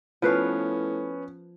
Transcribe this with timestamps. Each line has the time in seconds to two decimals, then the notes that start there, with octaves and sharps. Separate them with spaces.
0.22 A2 F3 B3 C#4 B4 F5